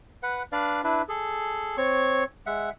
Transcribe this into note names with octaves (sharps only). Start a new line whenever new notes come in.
B4 F#5
D4 B4 D5 F5
D4 E4 B4
G#4 A4
C4 C#5 C#6
G#3 E5 F#5